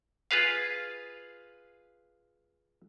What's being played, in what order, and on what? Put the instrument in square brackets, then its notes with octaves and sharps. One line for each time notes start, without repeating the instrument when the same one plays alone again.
[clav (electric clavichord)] F4 G#4 B4 F5